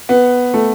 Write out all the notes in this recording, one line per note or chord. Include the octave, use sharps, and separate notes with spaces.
B3
A3